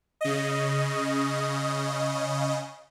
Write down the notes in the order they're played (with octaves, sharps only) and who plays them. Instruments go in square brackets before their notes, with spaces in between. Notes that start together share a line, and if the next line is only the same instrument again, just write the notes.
[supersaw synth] C#3 D#5